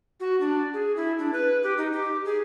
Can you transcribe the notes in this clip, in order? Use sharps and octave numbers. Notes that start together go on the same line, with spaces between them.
F#4
D4
G#4
E4
D4
B4
G4
D#4
G4
G#4